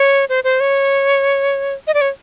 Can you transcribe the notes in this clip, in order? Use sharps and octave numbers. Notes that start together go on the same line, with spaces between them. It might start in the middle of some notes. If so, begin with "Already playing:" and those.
Already playing: C#5
C5
C5
C#5
D#5
D5
C#5